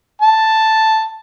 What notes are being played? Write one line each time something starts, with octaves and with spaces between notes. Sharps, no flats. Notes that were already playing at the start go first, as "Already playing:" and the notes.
A5